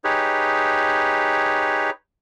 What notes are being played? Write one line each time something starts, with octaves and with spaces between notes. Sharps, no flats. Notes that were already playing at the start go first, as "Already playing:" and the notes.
D#4 G4 G#4 B4 C#5